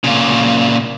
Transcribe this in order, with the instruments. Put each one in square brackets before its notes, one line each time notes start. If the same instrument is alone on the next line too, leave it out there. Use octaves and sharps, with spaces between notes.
[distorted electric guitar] A#2 C#3